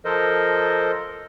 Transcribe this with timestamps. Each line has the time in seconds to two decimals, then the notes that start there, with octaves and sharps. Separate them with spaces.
0.05 F3 A4 A#4 C5 D#5